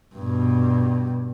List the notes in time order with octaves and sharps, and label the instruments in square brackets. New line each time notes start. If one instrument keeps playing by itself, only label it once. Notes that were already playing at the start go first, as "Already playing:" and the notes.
[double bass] G2 B2